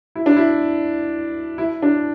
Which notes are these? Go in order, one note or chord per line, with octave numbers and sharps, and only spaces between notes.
E4
D4
E4
E4
D4